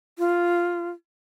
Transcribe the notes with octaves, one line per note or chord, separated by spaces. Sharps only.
F4